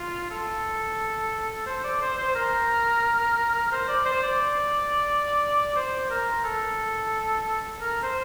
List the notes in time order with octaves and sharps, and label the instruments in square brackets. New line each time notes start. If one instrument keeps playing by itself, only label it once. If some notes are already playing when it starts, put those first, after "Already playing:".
Already playing: [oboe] F4
A4
C5
D5
C5
C5
A#4
C5
D5
C5
D5
C5
A#4
A4
A#4
C5